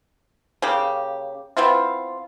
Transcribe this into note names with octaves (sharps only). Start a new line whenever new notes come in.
C#3 A#3 G4
B3 C4 E4 F4